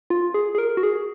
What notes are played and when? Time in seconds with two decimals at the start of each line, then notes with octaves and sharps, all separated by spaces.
0.10 F4
0.34 G#4
0.55 G#4
0.58 A#4
0.77 F#4
0.83 G#4